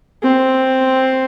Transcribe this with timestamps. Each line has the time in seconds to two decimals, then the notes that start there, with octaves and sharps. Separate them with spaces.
0.23 C4